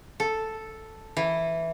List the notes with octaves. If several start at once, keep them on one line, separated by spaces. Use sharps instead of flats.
A4
E3